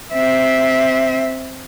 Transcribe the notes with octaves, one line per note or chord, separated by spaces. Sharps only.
C4 E5